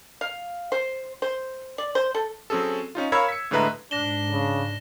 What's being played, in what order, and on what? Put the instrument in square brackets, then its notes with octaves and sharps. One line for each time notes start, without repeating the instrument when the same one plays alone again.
[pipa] F5
C5
C5
D5
C5
A4
[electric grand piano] F#3 C4 C#4 G#4 A4
C#4 D#4 F4
A#4 C#5 F5 B5 E6 G#6
B6 C#7
A2 D3 G#3 B4 E5 A#5
[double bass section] G#2 [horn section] D4 [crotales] A#6 E7 G7
[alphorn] C#3